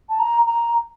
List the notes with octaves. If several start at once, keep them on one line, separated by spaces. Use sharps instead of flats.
A5
A#5
A#5